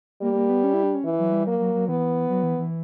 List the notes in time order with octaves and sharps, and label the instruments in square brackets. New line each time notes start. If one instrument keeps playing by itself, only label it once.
[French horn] G3 [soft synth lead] A#3
[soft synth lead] A#3
B3
C#4
E4
D4
C#4
[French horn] E3
[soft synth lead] F#3
G3
[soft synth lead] F#3 [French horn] A#3
[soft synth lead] F#3
F#3
[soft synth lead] E3 [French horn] B3
[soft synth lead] F#3
E3
E3